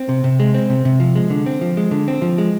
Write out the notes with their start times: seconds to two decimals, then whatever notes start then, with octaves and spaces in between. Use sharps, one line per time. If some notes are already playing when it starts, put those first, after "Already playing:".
Already playing: C4
0.09 C3
0.24 C3
0.40 G#3
0.54 C4
0.70 C3
0.85 C3
1.00 F3
1.16 G#3
1.30 D3
1.46 C4
1.61 F3
1.77 G#3
1.91 D3
2.08 C4
2.22 F3
2.38 G#3